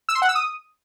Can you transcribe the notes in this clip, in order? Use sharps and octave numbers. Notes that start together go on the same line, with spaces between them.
E6
C6
F#5
E6
D#6